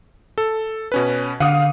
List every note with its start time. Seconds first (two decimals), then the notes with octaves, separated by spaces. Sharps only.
0.38 A4
0.92 B2 C#4 B4
1.40 D3 F5 F#5 D#6